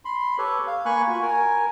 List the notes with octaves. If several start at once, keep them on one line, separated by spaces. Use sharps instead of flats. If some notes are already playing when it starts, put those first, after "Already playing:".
B5 C6
G4 A4 B4 C#5
F5
A#3 G#5 B5 C#6 F#6
F4 F#4
A#4 G#5